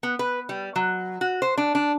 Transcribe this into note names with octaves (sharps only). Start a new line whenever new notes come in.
B3
B4
G3
F#3
F#4
C5
D4
D4